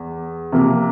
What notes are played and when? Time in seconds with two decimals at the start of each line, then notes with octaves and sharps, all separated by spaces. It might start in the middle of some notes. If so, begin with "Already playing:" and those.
Already playing: E2
0.52 C3 F3 A#3